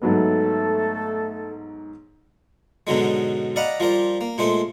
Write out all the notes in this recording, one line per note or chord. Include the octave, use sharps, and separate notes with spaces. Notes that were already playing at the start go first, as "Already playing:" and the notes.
G#2 F#3 A3 B3 A4
G#2 B2 D3 F#3 G#3
D5 D#5 F5 F#5 A#5 B5
F3 G3 A#4 D5
A#3
A#2 G#3 A3 C5